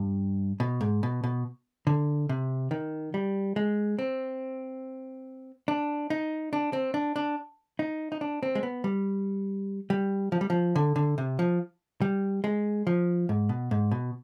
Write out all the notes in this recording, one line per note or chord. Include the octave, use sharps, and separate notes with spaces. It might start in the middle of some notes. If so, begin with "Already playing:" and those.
Already playing: G2
B2
G#2
B2
B2
D3
C3
D#3
G3
G#3
C4
D4
D#4
D4
C4
D4
D4
D#4
D#4
D4
C4
G#3
B3
G3
G3
F3
G3
F3
D3
D3
C3
F3
G3
G#3
F3
G#2
B2
G#2
B2